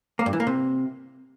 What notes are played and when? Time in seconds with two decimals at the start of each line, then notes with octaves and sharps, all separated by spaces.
0.19 A#3
0.26 G2
0.33 E3
0.40 A#3
0.47 C3